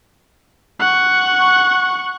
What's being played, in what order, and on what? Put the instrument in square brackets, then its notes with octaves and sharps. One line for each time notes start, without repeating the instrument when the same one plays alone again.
[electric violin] F#5 C#6